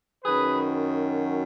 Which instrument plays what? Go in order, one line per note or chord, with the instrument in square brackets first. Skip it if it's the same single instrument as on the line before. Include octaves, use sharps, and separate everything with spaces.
[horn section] F#2 D#3 F#3 G#4 B4